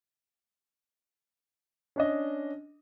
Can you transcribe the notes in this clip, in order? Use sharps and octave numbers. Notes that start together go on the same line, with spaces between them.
C#4 D4 D#5